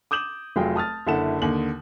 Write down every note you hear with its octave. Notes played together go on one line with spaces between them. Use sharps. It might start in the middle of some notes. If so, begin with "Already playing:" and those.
D6 D#6 G6 E7 F#7
F1 F#3 F4 G#4 G5
A5 D#6 F6 A6
F#1 D3 E4 A4 F#5 E7
D#2 D3 F#7